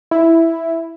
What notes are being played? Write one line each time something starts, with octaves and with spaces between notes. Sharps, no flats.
E4